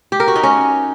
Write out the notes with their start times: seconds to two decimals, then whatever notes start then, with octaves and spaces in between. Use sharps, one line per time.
0.12 G4
0.20 A#4
0.28 F#4
0.36 D#4
0.43 C#4